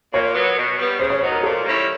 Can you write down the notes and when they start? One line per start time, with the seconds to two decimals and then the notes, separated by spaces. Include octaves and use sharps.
0.13 A#2 C#5
0.35 F#3 B3
0.57 B2
0.78 G3 B3
0.99 C#3 C5
1.10 C#5
1.21 F#3 B3 D#4 C5
1.32 A#4
1.43 A#2 A4
1.64 G3 A#3 C#4 E4